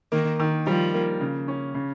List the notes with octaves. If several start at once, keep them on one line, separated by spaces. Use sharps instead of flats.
D#3 A#3
D#3
F3 G3
A#3
C#3
C#4
C#3